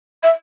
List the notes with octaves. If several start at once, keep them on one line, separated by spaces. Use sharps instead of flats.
E5